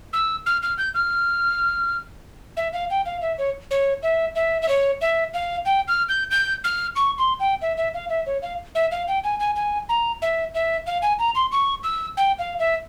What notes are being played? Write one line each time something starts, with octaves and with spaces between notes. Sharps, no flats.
E6
F6
F6
G6
F6
E5
F5
G5
F5
E5
C#5
C#5
E5
E5
E5
C#5
E5
F5
G5
F6
G6
G6
F6
C#6
C6
G5
E5
E5
F5
E5
C#5
F5
E5
F5
G5
G#5
G#5
G#5
A#5
E5
E5
F5
G#5
A#5
C6
C#6
E6
G5
F5
E5